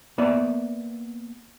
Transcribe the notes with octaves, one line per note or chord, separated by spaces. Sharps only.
A#3 B3 D5 E5